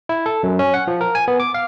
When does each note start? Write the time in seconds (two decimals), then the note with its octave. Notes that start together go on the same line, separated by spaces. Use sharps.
0.09 E4
0.26 A4
0.43 F#2
0.59 C#4
0.74 F#5
0.87 F3
1.01 A#4
1.15 G#5
1.28 B3
1.40 D6
1.54 F5